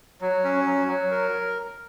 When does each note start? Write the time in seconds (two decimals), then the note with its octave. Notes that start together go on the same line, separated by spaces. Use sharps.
0.21 F#3
0.44 C#4
0.66 F#3
0.88 F#3
1.11 A#4